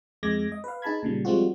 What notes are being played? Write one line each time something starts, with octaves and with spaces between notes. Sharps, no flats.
F2 G#3 D6 G#6 A#6
D#5
B4 F5
D#4 G#4 A5 B5 G#6
A#2 C#3 G3
F3 G3 G#3 C4 F4 F#4